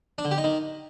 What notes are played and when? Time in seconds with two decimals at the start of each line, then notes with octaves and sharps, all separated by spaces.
0.18 D4
0.25 D3
0.31 G4
0.38 D#4
0.44 D#3